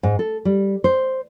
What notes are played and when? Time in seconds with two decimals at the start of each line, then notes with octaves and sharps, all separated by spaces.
0.03 G#2
0.19 A4
0.45 G3
0.84 C5